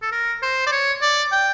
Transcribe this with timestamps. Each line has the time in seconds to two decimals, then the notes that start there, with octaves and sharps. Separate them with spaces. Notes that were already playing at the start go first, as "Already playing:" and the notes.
0.02 A4
0.12 A#4
0.42 C5
0.67 D5
0.72 C#5
1.02 D5
1.32 G5